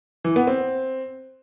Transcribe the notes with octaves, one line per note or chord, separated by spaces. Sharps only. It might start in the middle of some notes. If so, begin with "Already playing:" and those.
E3
B3
C4